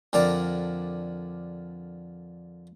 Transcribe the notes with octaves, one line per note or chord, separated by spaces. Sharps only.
F2 D3 D4 A#4 D5 A#5